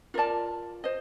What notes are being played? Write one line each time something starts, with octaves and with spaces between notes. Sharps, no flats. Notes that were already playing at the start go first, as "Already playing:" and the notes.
F4 A#4 D5 A5
C5 D#5